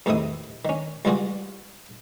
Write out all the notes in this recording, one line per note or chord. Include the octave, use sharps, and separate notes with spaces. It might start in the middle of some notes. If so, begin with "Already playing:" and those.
E2 A2 C3 D#3 E4 D#6
D#3 C#4
C#2 E3 G3 F4 F#4 G#4